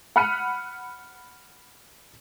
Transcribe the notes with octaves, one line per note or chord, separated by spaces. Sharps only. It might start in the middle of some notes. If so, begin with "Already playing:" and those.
F#5 B5 F6 F#6 C#7 D#7